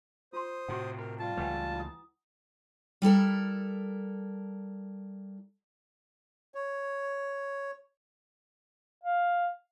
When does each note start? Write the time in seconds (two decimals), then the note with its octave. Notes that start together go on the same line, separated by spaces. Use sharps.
0.33 F4 C5 C6 D#6
0.69 A2 C3 F#4 F#5
0.99 A#4 B5
1.19 G3 F4 A5
1.37 C#2 E3 A3 B4 F#5 G#5
1.76 E4 D#6
3.02 G3 E4 A4 A#4
6.55 C#5
9.04 F5